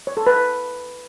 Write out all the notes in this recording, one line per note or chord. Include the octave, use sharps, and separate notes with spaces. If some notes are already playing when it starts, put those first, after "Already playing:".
C#5
A4
B4